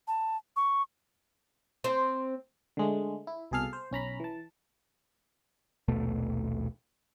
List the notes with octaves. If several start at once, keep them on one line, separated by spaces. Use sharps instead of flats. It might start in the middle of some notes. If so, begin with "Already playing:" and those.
A5
C#6
C4 C5
D3 G#3 A3
E4
C2 B2 G#4 A4 F5 F6
C5
B1 C#4 A#5 B5
E3 A5
A#1 D#2 B2 A3